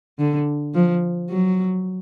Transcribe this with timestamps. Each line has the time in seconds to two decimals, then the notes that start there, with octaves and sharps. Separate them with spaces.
0.19 D3
0.74 F3
1.30 F#3